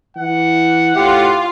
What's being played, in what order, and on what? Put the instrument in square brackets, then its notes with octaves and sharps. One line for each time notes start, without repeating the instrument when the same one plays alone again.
[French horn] E3 [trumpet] F#5
[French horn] A2 [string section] F4 F5 [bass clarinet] G4